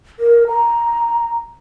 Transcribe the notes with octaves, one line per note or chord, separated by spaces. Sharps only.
A#4
A#5